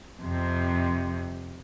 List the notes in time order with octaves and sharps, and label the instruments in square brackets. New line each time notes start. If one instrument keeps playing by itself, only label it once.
[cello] F2 C3